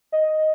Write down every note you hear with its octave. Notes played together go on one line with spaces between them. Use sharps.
D#5